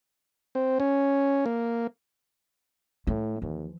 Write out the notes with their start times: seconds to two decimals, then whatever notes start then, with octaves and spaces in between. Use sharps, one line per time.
0.55 C4
0.80 C#4
1.46 A#3
3.07 A2 A3 E4
3.42 D#2 E3 F3